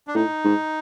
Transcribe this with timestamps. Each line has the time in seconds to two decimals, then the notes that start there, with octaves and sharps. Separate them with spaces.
0.08 D4
0.15 A2 D#4
0.45 G#2